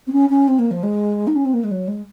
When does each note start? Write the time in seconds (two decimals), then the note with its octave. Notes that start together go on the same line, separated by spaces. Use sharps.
0.07 C4
0.12 C#4
0.30 C#4
0.48 C4
0.59 A#3
0.71 F3
0.83 G#3
1.27 D#4
1.36 C#4
1.45 C4
1.54 A#3
1.64 G#3
1.71 F#3
1.88 G#3